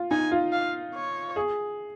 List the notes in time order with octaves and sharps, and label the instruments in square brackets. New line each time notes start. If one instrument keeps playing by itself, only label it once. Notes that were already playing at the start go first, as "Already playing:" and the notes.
Already playing: [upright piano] F4
[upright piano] D#4 [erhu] G#5
[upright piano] F4
[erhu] F5
C#5
[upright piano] G#4